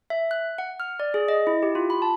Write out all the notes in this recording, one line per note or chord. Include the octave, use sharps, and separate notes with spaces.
E5
F#6
F#5
F6
D5
G#4
D#5
E4
G4
F4
B5
A5